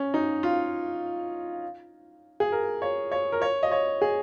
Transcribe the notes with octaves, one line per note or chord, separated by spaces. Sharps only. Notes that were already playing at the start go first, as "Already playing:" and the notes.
Already playing: C#4
D#4
F4
G#4
A#4
C#5
C#5
A#4
C#5
D#5
C#5
G#4